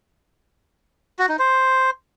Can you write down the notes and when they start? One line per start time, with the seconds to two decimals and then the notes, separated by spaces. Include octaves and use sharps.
1.19 F#4
1.29 D#4
1.39 C5